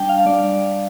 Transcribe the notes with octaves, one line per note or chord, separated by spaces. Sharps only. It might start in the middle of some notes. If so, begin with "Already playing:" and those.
Already playing: G3 D4 G5 A5
F5
G3 D4 D5